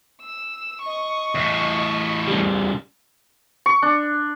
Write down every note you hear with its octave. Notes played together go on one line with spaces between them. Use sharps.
E6
D#5 C#6
E2 A2
C#3 G3
C#6
D4